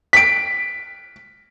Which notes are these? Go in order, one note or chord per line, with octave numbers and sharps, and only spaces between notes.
B6 D7